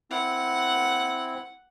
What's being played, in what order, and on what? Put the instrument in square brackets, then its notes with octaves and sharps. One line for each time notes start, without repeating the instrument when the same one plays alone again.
[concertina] C4 E4 [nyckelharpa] F#5